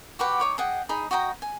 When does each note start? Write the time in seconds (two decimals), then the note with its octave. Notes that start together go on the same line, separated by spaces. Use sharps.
0.19 F#4 G4 B4 F#5
0.40 D#4 C#5 D6
0.58 G#4 D#5 F#5 G5
0.89 D#4 G#4 D#5 B5
1.11 F#4 D#5 G5 A#5
1.42 G#5